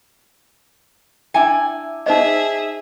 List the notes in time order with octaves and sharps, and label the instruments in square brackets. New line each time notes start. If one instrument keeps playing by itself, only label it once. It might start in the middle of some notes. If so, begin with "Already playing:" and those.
[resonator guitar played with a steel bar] D4 E4 G#5 [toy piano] G5
[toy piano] D#4 C5 D#5 [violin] G#4 E5